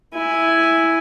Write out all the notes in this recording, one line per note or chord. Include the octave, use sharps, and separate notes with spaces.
E4 G#5